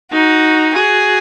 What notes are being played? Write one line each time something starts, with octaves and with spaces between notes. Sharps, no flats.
D#4 F#4
F#4 G#4